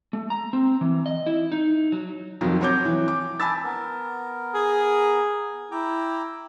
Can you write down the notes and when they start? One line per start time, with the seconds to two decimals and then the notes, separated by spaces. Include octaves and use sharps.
0.13 A3
0.30 A#5
0.53 C4
0.81 E3
1.06 D#5
1.26 E4
1.52 D#4
1.92 F#3
2.41 F2 D#3 F3 F#3
2.61 F#3 C4 F#4 C#5 D6 G6
2.85 E3
3.08 D6
3.40 G#5 A5 B5 E6 A6
3.64 B3 A#4
4.54 G#4
5.71 E4 G5 A#5 D6